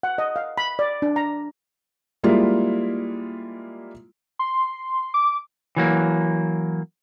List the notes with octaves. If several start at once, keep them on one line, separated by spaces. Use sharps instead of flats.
F#5
D#5
F5
B5
D5
D4
A#5
G3 G#3 A#3 E4 F4
C6
D6
E3 F#3 A#3